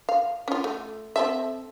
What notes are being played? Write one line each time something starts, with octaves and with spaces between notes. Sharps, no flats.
F5
C#4 F4
A3
C4 A4 E5